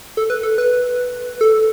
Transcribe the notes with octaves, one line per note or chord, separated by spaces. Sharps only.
A4
B4
A4
B4
A4